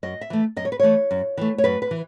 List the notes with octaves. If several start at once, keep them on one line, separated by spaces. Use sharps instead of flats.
F#2 D#5
E5
E3 A3
F#2 D#5
C#5
B4
E3 A3 C#5
F#2
E3 A3
C#5
F#2 B4
B4
E3